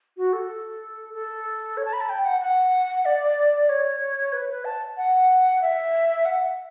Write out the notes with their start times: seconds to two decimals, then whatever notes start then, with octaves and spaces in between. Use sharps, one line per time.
0.17 F#4
0.33 A4
1.14 A4
1.77 C#5
1.85 A5
1.93 B5
2.01 A5
2.09 G5
2.25 F#5
2.41 F#5
3.05 D5
3.69 C#5
4.33 B4
4.49 B4
4.65 A5
4.97 F#5
5.62 E5
6.25 F#5